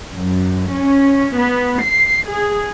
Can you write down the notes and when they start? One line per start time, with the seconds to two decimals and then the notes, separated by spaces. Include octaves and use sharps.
0.14 F#2
0.73 C#4
1.37 B3
1.85 C7
2.29 G#4